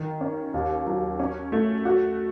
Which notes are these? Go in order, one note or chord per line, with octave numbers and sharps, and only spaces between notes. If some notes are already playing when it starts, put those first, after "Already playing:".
Already playing: D#3
C#4
D#2
F#3
C#4
A3
F#4